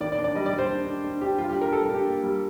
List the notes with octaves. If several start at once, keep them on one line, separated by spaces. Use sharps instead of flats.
D#3 D5
D5
D4
D5
G3 D#5
D5
G3
C5
D4
D4
D4
D4 G4
G3 F4
G4
D4
A#4
G3 A4
A#4
D4
G4
A#3
G3 G4